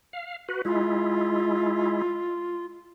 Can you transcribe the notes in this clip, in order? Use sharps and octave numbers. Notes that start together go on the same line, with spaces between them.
F5
F#4 B4
G#3 E4 F4